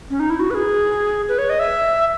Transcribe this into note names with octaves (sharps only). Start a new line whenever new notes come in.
C#4
D#4
E4
F#4
B4
G#4
B4
C#5
D#5
E5